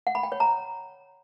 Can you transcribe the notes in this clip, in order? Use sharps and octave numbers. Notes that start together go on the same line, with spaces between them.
F#5
B5
G5
C#5
A#5